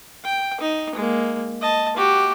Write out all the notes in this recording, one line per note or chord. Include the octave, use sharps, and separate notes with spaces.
G5
D#4
G#3 A#3
D#5 A5
F#4 G4